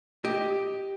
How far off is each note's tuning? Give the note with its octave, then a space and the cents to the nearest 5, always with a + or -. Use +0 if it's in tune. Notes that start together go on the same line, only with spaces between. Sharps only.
G4 +0 D#5 +5